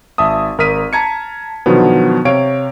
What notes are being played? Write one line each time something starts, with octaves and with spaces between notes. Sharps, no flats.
G#1 E5 A5 D#6
G#1 A#4 D#6 F6 B6 D#7
A5 A#5 G#6 C#7
B2 D3 D#3 F3 F#3 B3
C3 C#5 F5 D7